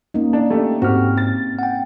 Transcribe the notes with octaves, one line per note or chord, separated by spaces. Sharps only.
A#3 C#4 D#4
D4
A3 D4 G4
G#2 C4 F#4 G4 F6
A6
F#5 G5